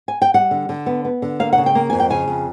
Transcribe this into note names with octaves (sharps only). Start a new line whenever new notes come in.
G#5
G5
G3 F#5
D3
D3
B3
B3
D3
A#3 F5
F#5
C#3
G5
A#3
F2 G#5
G5
C#3 G#5
F2